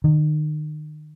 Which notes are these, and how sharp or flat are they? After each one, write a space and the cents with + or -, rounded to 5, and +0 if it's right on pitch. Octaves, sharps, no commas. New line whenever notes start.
D#3 -35